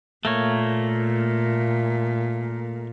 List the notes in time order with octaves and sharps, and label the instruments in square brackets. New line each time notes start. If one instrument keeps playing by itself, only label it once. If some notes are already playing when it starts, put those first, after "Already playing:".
[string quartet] A#2 [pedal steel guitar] A3 A#3 C#5